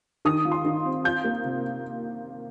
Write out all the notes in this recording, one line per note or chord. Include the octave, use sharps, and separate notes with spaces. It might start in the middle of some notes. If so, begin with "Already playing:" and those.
D#3 D#6
F4
C6
D#3
C4
F4 G6
A#3
C3